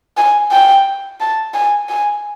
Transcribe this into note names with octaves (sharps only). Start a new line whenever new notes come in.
G#5
G5
A5
G#5
G#5